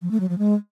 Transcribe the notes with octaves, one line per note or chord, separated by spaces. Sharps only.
F3
A3
F#3
F3
G#3